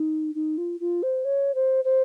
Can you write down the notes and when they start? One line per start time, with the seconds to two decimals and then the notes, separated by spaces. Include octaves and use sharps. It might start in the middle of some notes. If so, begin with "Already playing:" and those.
Already playing: D#4
0.35 D#4
0.58 F4
0.80 F4
1.03 C5
1.25 C#5
1.55 C5
1.84 C5